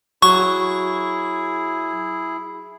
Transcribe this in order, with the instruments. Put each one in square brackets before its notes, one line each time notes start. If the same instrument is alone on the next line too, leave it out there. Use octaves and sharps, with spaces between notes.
[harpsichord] F#3 [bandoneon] E4 G#4 [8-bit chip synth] C#6